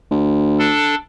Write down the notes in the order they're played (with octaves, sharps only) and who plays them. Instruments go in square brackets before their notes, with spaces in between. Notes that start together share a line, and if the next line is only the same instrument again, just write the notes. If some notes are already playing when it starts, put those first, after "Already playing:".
[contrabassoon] D2
[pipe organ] D4 A4